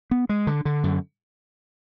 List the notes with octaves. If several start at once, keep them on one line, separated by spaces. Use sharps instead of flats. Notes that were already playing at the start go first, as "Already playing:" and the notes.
B3
G#3
D3
D3
F#2